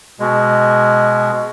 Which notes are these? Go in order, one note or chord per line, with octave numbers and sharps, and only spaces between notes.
B2 G#3